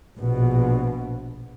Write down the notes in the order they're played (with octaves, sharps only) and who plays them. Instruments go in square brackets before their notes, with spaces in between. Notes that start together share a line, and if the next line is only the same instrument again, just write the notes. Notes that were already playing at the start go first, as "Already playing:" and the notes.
[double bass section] A#1 B2